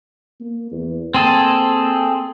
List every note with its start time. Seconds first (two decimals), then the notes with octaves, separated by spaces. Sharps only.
0.41 A#3
0.72 E2
1.14 A#3 C4 G#4 A4